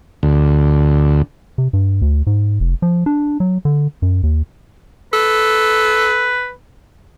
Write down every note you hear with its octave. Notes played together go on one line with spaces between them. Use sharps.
D2
C3
G2
D2
G#2
F1
F3
D4
F#3
D3
F#2
D#2
A4 B4